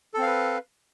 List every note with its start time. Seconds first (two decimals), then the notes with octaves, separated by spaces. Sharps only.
0.14 A4
0.18 C4
0.22 F5
0.26 B4